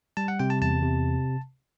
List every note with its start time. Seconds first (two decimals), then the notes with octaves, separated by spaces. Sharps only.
0.17 G3 A5
0.28 F#5
0.39 C3 G5
0.50 A5
0.62 E2 A5
0.82 C3